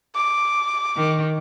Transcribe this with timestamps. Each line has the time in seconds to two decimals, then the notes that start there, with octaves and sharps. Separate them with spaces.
0.15 D6
0.96 D#3